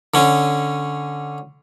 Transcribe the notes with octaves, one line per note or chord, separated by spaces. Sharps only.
D3 C#4